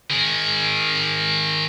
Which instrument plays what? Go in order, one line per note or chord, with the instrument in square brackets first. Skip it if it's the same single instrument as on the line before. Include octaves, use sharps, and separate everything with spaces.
[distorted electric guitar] D#3 G#4